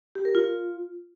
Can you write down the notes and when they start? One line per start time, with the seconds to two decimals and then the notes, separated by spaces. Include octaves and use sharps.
0.15 G4
0.25 A#4
0.35 F4